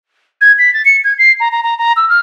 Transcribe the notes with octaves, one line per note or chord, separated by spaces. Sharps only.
G#6
B6
A6
C#7
G#6
C7
A#5
A#5
A#5
A#5
E6
F6